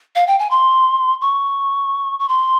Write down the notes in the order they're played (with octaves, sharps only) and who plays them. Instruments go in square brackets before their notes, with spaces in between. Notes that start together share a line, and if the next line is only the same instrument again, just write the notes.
[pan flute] F5
G5
G#5
C6
C#6
C#6
C6